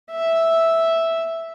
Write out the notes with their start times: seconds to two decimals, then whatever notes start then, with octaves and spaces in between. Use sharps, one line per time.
0.11 E5